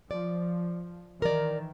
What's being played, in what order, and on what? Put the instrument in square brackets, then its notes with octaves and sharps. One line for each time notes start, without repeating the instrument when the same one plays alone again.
[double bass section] F3 [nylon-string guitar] D5
[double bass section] D#3 E3 [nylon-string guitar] A#4 D5